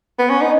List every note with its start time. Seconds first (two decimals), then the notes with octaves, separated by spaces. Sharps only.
0.19 B3
0.30 C#4
0.41 D#4